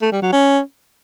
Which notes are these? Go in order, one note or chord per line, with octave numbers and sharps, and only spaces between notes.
A3
G3
F#3
C#4